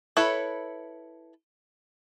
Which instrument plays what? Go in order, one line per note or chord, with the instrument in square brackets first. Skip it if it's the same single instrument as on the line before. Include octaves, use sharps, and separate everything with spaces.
[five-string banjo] E4 A4 B4 C#5